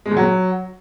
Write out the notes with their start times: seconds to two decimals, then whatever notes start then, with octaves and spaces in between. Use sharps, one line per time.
0.06 G#3
0.11 A#2
0.17 F#3